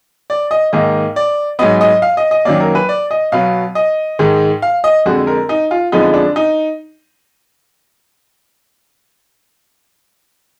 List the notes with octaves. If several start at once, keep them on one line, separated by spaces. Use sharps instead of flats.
D5
D#5
G#2 D#3 A#3 D#5
D5
G#2 F#3 B3 D#5
D#5
F5
D#5
D#5
F#2 D#3 F#3 A#3 D5
A#4
B4
D5
D#5
B2 F#3 B3 F5
D#5
G#2 D#3 G#3
F5
D#5
F2 D3 G#3 F#4
A#4
D#4
F4
F2 D3 F3 G#3 B3 D#4
D4
D#4